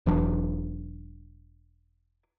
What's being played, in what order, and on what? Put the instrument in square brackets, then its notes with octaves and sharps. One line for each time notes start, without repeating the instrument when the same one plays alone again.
[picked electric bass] E1 E3 F#3 D4